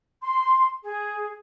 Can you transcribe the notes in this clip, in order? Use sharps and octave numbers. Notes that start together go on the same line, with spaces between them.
C6
G#4